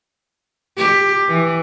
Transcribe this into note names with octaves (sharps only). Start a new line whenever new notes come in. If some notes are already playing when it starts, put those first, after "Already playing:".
G4
E3